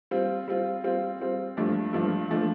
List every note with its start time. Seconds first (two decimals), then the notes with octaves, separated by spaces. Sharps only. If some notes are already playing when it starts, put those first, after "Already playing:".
0.11 G3 C4 F4
0.48 G3 C4 F4
0.84 G3 C4 F4
1.20 G3 C4 F4
1.57 G2 F3 A3 D4
1.93 G2 F3 A3 D4
2.31 F3 A3 D4